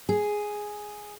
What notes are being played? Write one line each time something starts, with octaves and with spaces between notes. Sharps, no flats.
G#4